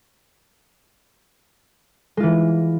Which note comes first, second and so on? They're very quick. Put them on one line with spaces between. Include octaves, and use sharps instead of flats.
G#3 F4 E3